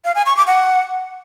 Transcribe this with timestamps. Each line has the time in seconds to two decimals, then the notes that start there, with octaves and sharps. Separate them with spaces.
0.05 F5
0.15 G#5
0.26 C#6
0.37 D6
0.47 F#5